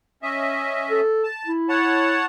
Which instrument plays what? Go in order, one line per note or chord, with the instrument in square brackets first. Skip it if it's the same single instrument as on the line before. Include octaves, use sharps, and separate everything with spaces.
[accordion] C#4 D#5 E5
[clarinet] A4
[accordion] A5
[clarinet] E4
[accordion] C#5 F#5 A5